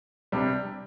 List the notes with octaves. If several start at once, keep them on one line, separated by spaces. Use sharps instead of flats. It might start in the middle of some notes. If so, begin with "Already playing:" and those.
C3 G3 D4